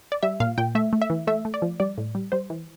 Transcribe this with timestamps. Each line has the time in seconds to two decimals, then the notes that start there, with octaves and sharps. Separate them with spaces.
0.12 D5
0.23 G3 E5
0.40 A#2 F5
0.58 A#2 G5
0.75 A3 E5
0.93 A3
1.02 E5
1.10 E3
1.27 A3 E5
1.45 A3
1.54 D5
1.62 F3
1.80 G3 D5
1.98 A2
2.15 G3
2.32 G3 C5
2.50 E3